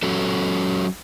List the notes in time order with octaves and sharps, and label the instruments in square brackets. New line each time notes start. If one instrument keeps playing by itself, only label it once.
[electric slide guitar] F#3 C#4 F#4 A4 C#5